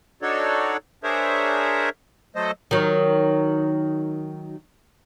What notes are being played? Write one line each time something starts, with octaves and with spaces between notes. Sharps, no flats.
D4 D#4 F#4 A4 C#5 D5
D4 G#4 A#4 C5 C#5 E5
F#3 A3 A4 C5 D#5
D#3 F#3